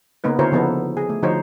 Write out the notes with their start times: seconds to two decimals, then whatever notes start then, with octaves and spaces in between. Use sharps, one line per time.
0.24 C#3 A#3 B3 D#4 B4
0.39 D3 E4 F#4 A#4 C5 C#5
0.52 C#3 F3 B3 D#4 A4
0.97 G#4
1.09 A3
1.22 D3 F3 D#4 F#4 C5 C#5